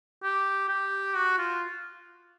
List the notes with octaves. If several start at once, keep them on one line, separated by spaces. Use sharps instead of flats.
G4
G4
F#4
F4